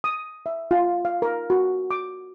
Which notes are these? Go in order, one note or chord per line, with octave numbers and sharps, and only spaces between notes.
D#6
E5
F4
F5
A#4
F#4
D6